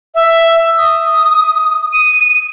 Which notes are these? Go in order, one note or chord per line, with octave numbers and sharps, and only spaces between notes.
E5
D#6
D#7